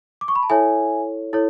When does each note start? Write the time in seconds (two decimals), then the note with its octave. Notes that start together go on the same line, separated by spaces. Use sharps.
0.21 D6
0.28 C#6
0.36 B5
0.43 A5
0.50 E4 A4 C#5 E5 G#5
1.33 E4 A4 C#5